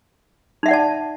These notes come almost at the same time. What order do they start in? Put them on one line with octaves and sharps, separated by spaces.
D#4 E5 F#5 D5 A5